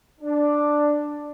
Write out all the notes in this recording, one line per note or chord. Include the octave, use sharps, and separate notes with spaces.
D4